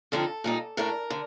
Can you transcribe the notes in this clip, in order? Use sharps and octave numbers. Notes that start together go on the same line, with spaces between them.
F2 D3 F3 C4 D#4 A4
A#2 G3 A#3 D#4
A2 A3 D4 A#4
D3